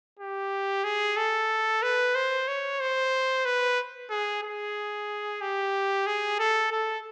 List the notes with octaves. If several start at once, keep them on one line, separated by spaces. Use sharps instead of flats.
G4
G#4
A4
B4
C5
C#5
C5
B4
G#4
G#4
G4
G#4
A4
A4